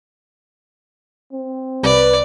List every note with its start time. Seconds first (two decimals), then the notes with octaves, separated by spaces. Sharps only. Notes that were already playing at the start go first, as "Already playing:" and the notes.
1.33 C4
1.83 C2 B4 D5